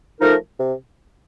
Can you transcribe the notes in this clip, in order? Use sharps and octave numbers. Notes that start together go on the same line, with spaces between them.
F3 A3 D#4 A#4
C3